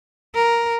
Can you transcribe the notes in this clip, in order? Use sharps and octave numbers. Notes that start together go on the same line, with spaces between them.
A#4